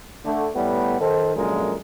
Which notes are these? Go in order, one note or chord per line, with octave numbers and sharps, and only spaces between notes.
D3 A3
A2 G3 A3 B3
D#3 A4 C5
F#2 A#2 D3 F3 G#3 A#4